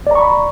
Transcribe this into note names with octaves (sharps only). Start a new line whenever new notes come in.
D5 A#5 B5 C#6